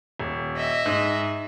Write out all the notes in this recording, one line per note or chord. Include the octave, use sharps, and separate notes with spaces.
D#1
D#5 E5
G#2